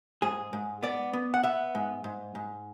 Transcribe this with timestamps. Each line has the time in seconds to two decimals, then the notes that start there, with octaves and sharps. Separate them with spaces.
0.22 G#2 G#4
0.53 G#2
0.83 B3 D5
1.13 B3
1.34 F#5
1.43 B3 E5
1.75 G#2
2.04 G#2
2.35 G#2